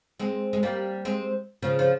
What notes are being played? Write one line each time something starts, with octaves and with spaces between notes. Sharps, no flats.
G#3 C4
G#3
G3 A#3
G#3 C4
C#3 F3
F3